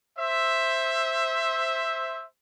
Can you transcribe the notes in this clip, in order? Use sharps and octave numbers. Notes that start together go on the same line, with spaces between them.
C5 E5